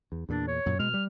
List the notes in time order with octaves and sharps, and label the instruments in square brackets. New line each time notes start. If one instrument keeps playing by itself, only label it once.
[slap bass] E2
[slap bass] E2 A#2 [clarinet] D4
[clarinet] C#5
[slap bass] F#2 A#2
[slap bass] B2 G#3 [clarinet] F6
[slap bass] G3